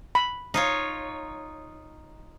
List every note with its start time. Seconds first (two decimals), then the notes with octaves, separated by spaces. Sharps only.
0.15 B5
0.54 D#4 F4 C#5